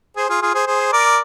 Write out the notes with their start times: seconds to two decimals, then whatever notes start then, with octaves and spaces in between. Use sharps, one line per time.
0.16 G#4 C5
0.29 F4 G#4
0.42 F4 G#4
0.54 G#4 C5
0.67 G#4 C5
0.92 A#4 D5